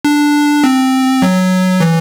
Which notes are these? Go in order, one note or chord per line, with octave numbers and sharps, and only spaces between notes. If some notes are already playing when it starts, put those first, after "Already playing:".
D4
C4
F#3
E3